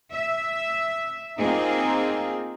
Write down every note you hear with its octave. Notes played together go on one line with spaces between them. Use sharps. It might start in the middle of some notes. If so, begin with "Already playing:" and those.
E5
A#3 C4 D#4 F4 G#4